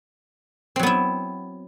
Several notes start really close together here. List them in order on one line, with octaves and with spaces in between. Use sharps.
C4 F#3 B3 E4